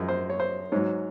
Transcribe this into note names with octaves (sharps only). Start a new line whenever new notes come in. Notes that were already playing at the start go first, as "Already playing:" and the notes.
Already playing: F#2 F3 G#3 A#4
C5
C#5
C5
G#2 F#3 C#5